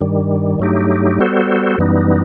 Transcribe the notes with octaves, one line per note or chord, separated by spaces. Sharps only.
G2 D#3 G3
G2 F#3 A3 D#4 G4
G3 B3 F#4 A4 C5
F#2 E3 G3 B3 D#4